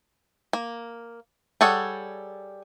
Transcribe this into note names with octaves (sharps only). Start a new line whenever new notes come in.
A#3
G3 G#4 A4 C#5 F#5